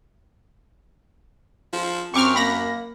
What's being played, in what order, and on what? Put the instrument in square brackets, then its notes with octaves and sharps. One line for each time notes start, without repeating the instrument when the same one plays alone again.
[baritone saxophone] F3
[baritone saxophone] F#2 [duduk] C4 [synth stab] C#6 D6 F6
[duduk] A#3 [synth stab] B5 A#6